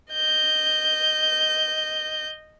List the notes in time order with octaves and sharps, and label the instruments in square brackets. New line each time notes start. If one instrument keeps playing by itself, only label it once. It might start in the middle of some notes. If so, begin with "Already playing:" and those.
[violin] D#5 G6